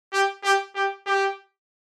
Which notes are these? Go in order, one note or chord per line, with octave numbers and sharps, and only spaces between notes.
G4
G4
G4
G4